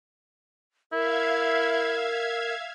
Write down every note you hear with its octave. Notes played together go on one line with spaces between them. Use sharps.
E4 A#4 E5 F5 G#6